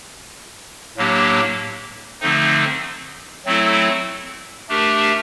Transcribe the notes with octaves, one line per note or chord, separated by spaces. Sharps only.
A2 F#3 A#3 D4 G4
D3 F3 A3 C4 D#4
F#3 A3 C4 E4 A4
A3 D4 G4 A#4